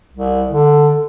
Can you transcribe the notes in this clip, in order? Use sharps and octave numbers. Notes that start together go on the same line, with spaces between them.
C2
D3